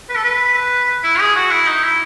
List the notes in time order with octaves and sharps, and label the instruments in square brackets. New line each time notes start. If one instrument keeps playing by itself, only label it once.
[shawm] B4
A4
B4
E4
G#4
F#4
E4
D#4
E4